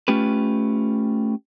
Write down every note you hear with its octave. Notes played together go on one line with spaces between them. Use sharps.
A3 C#4 F4 G4 B4